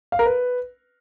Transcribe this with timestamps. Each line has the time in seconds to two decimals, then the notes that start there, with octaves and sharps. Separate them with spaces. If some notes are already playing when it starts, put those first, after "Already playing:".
0.12 F5
0.19 A#4
0.26 B4